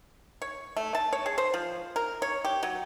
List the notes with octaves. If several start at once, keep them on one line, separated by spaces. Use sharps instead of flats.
C#5
A3
A5
C#5
G#4
C5
F3
A#4
C#5
G4
F#3